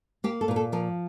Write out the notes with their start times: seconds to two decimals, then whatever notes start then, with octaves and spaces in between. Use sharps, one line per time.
0.24 A#3 G4
0.41 A4
0.48 A#2 A#4
0.56 A4
0.72 F3 A#4